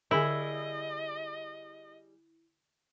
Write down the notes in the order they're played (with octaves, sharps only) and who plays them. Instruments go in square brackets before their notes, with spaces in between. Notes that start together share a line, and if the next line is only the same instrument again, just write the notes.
[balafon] D3 [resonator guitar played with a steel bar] G3 G#4 [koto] E4 [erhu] D#5